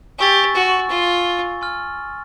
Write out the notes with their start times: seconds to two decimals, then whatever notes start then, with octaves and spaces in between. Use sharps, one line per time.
0.19 G4 G#5 C#6 E6 A6
0.55 F#4
0.90 F4
1.61 G#5 C6 F6